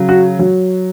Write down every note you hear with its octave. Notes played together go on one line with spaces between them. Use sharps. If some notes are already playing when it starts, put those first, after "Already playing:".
Already playing: C#3 F#3
F#4
F#3